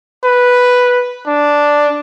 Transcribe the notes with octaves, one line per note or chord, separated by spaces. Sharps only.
B4
D4